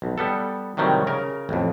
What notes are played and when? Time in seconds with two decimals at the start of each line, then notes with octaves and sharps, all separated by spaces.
0.02 B1
0.18 G3 B3 A4
0.77 A2 C3 D#3 F#3 G3
1.07 C#3 A#4
1.49 A1 F2